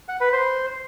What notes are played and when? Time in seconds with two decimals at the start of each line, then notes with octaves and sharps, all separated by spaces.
0.09 F#5
0.21 B4
0.33 C5